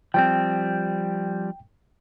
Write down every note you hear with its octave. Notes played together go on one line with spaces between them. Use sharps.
F3 G3 C4 G5